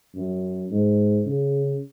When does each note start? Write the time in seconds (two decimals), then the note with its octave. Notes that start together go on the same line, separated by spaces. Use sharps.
0.15 F#2
0.71 G#2
1.26 C#3